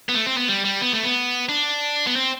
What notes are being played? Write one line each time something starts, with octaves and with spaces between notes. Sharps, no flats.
B3
A3
C4
B3
G3
G3
B3
A3
B3
D4
B3
C4